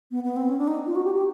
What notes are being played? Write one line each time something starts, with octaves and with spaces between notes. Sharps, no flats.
B3
B3
C4
C#4
D4
D#4
F4
F#4
G4
G4